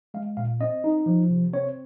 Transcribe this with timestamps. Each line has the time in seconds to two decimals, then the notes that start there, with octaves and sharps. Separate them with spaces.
0.14 G#3 F5
0.37 A#2 F5
0.60 C4 D#5
0.84 D#4
1.06 F3
1.30 C3
1.53 C4 C#5